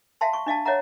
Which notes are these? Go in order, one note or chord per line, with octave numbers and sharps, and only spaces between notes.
E5 F5 G5 A5 C6
C#6
D4 D#5 F5 A5
C#5 D#5 E5 F#5 A#5